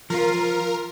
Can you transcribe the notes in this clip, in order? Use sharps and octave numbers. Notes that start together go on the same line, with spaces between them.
F3 F4 A#4